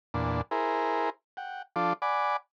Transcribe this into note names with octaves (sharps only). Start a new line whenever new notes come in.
E2 A#2 D4
E4 G#4 A#4 C5
F#5 G5
F3 D4 F4 A4 D6
D5 F#5 G#5 B5 D6